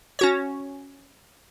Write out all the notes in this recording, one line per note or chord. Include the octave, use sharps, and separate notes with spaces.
C#4 F#4 C#5